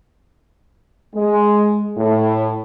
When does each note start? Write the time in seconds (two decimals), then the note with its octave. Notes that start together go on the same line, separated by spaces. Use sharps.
1.15 G#3
1.98 A2